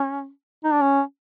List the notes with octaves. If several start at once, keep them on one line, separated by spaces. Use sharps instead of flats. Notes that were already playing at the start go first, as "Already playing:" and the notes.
Already playing: C#4
D#4
D4
C#4